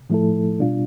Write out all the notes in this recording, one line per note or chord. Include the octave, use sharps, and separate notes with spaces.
A2 F3 A3 E4 A4
B2 G3 D4 F4